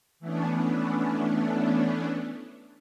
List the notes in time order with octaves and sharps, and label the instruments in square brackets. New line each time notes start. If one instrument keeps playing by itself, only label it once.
[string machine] E3 A3 B3 C#4 D4